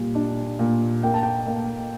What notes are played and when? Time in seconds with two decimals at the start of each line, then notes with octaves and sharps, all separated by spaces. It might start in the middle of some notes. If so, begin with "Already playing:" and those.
Already playing: A#2 G3
0.15 D4
0.59 A#2
1.03 A#3 G5
1.14 A5
1.23 G5
1.47 A#3